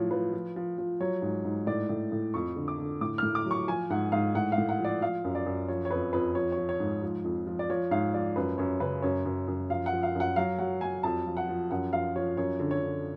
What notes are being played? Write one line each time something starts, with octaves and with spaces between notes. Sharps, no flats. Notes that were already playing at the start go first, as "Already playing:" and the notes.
Already playing: A2 F3 F#3 C#5
F3 B4
F3
F3
F3
F#3 C#5
G#2
G#2
A2 D5
A2
A2
F2 C#6
D3
D6
D3
A2 D6
A2 F6
D6
F#3 C#6
F3 G#5
G#2 F#5
G#2 F5
A2 F#5
F5
A2
F#5
F3
D5
F3 F5
F#2
D5
F#2
F3 C#5
C#5
F2 B4
F2 B4
F3 C#5
F3 C#5
C#5
G#2
F3
F2
F3
D5
F3 C#5
G#2 F5
F3 D5
F#2 B4
F#2 C#5
C#3 B4
F#2 C#5
F#2
F#2
F3 F5
F#5
F3
F5
F#2
F#5
F#3 F5
F#3 F#5
F#3 G#5
F2 A5
F3
F#5
F3
F#2 F#5
F3 F5
F3 C#5
F#2 C#5
D3
C#5
D3